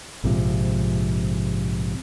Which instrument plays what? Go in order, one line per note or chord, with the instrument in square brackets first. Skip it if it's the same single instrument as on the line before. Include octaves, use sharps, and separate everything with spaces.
[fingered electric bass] A#1 G#2 C3 F3